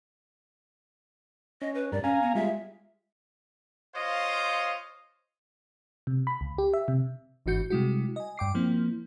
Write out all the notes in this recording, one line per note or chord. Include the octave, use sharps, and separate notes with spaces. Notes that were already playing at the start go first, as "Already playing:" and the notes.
C#4 D#5
B4
G2 A#4 D5
C#4 F5 G#5 A#5
B3
G3 G#3 F4 E5
F4 C5 C#5 D#5 F5
C3
B5
C#2
G4
E5
C3
G1 G#2 E3 F#4 G6 C#7
C3 G3 G#3 E4 F#4
D#5 G#5
G2 G5 D6 C7
F3 A#3 C4 E4